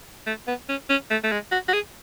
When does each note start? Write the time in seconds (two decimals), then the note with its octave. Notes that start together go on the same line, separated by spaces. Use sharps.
0.26 A3
0.47 B3
0.69 C#4
0.90 C#4
1.10 A3
1.24 A3
1.32 G#3
1.52 F#4
1.68 F#4
1.73 G#4